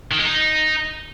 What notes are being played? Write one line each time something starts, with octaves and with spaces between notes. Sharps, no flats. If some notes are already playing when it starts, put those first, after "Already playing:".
D#3
G#3
D#4